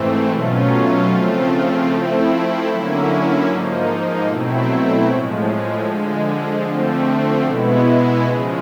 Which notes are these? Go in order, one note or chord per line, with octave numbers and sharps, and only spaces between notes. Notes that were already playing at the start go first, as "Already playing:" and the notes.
Already playing: G#2 E3 A3 C4
B2 F#3 A3 C#4 F4
C#3 F3 A3 C4 F4
F3 A3 C4 E4
D3 F#3 A#3 C#4 E4
G#2 F3 A#3 D#4
B2 F#3 A3 C4 E4
A2 F3 G#3
D3 F3 G#3
D3 F3 A3 C4
B2 G#3 B3 E4
C#3 F3 G#3